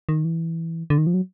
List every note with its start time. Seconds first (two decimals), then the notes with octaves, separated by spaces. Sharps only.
0.09 D#3
0.25 E3
0.90 D3
0.98 D#3
1.07 F3
1.14 F#3